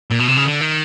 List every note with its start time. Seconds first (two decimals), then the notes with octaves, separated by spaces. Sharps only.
0.11 A#2
0.20 B2
0.28 C3
0.37 C#3
0.45 D3
0.61 D#3